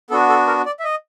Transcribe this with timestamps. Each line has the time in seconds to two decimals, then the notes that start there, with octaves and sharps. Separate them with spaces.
0.10 B3 D4 F#4 A4
0.29 A4
0.47 A#4
0.66 D5
0.80 E5
0.84 D#5